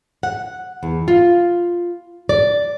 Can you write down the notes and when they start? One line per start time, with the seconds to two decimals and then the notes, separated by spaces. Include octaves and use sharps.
0.23 F#5
0.83 E2
1.08 F4
2.29 D5